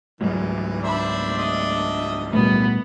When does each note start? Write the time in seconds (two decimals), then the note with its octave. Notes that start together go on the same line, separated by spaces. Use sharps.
0.21 C#2 G#2 E3 F#3 G#3
0.84 D4 C5 E5 B5
1.38 D#5 E5
2.33 A#2 G3 A3 B3